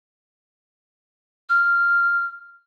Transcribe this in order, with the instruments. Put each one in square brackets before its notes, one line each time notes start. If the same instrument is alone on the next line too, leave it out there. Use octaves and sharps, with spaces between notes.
[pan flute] F6